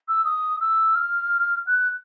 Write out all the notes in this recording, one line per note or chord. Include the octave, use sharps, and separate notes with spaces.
E6
D#6
E6
F6
F#6